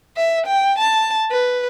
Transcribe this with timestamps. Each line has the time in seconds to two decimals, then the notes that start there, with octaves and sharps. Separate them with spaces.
0.17 E5
0.46 G5
0.79 A5
1.32 B4